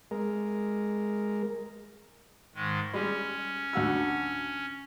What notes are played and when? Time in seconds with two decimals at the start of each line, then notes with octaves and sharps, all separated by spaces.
0.11 G#3 A#4
2.55 G#2 D#3 G#3
2.94 G3 G#3 C#4
3.73 D2 F#4 E6